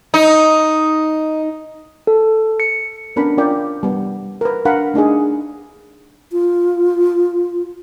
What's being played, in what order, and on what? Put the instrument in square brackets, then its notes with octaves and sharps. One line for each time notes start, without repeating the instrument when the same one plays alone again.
[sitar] D#4
[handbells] A4
C#7
[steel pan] B3 C#4 D4 A#4 A5 B5
C#4 F4 A#4 D5 G5
G3 B3
A#4 B4
D4 A#4 F5 F#5 B5
A3 D4 D#4 G#4
[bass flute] F4